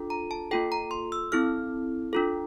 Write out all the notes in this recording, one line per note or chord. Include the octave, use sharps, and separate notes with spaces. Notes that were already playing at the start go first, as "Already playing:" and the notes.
Already playing: D4 F4 A4
A#5
A5
A#3 F4 A4 G5
A#5
C6
E6
C4 E4 A4 F6
D4 F4 A4